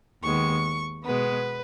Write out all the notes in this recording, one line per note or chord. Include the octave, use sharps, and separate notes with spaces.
D#2 D#3 G#3 B3 C#6
B2 G#3 B3 B4